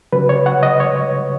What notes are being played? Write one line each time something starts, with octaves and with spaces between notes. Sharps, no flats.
C#3 F#3 B4
C#5
F#5
D#5
C#5